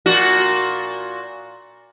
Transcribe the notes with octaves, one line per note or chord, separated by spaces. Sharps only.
A#2 F#4